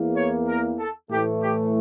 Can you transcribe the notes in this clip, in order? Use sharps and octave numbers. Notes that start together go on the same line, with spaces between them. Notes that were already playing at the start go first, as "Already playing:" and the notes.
Already playing: E2 E3 A#3
C#5
A#4
A4
A2 E3 A3 G4
G4